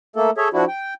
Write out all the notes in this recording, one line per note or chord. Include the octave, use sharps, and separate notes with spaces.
A3 A#3 A4
G#4 A4 C#5 E5
F3 D4 E4 F#4
G5